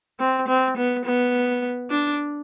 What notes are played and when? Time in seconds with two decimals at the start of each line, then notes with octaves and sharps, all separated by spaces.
0.20 C4
0.48 C4
0.76 B3
1.05 B3
1.90 D4